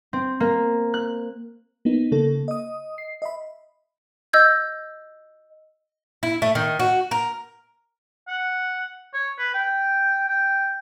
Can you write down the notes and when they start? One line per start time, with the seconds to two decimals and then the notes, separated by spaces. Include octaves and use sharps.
0.13 C4
0.40 A#3
0.94 F#6
1.85 A#3 B3 D#4
2.12 C#3 A#3 A4
2.48 D#5 D#6
2.98 C7
3.22 D#5 E5 B5
4.33 D#5 E6 G6 G#6
6.23 E4
6.42 A3
6.55 D#3
6.79 F#4
7.11 A#4
8.28 F#5
9.14 C#5
9.39 B4
9.54 G5
10.28 G5